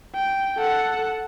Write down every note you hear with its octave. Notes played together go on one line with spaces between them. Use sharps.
G5
A4 F#5